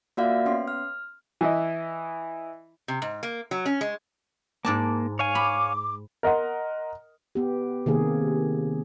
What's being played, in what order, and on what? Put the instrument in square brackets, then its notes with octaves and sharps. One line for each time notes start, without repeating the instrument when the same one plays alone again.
[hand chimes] A#3 F4 F#4 D5 E5 F5
B3 C#4 C6
F6
[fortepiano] E3 E4 D#5
[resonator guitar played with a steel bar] C3
G#2
A#3
F#3
C#4
G#3
[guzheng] G#2 D5 A5 [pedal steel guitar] A#3
[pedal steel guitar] C#5 F5 G#5
[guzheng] B5 [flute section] D6
[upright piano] A#4 D#5 F#5 C6
[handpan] B3 G4
C3 D#3 A#3 G#4